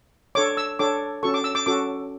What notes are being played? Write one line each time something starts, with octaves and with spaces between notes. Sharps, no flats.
D4 A4 C#5 D6
E6
D4 A4 C#5 D6
C#4 F#4 A4 C#6
D6
E6
D6
C#4 F#4 A4 D6